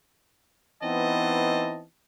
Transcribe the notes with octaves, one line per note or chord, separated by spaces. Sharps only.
E3 B3 C4 D#4 D#5 A5